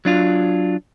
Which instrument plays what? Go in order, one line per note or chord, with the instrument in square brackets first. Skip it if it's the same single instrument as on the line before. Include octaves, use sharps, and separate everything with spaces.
[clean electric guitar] F#3 D4 F4